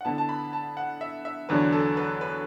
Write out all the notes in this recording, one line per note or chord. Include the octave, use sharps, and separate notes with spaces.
F#5
D3 B3 E4 A5
A5
B5
A5
F#5
E5
E5
E2 D3 F#3 D4 B4
A4
B4
B4